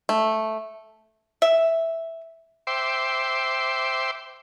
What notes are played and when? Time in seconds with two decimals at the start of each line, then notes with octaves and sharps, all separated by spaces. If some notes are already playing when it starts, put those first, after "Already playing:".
0.09 A3
1.42 E5
2.67 C5 E5 G5 C6 D6